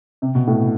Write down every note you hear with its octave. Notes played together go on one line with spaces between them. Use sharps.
C3
B2
A2